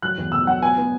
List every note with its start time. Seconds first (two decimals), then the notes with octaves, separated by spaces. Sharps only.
0.02 F#3 F#6
0.17 E2
0.32 B2 E6
0.47 F#3 F#5
0.62 B3 G#5
0.77 B3